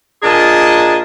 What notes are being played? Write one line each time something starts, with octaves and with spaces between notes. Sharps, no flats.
A#2 D4 G#4 A#4 D#5 A5